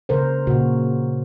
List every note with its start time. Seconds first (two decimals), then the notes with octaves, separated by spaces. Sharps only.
0.09 C#3 A#4 C5
0.47 A#2 C#3 F#4